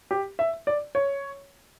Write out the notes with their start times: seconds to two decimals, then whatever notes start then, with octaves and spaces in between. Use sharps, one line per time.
0.11 G4
0.39 E5
0.67 D5
0.95 C#5